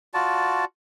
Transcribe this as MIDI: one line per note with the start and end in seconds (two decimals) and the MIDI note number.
0.14 0.65 65
0.14 0.65 66
0.14 0.65 74
0.14 0.65 81